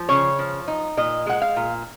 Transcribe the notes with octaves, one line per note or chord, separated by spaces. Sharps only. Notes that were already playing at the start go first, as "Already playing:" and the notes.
Already playing: F3
C#3 C#5
F3
D#4
A#2 D#5
G#3 F#5
F5
A#2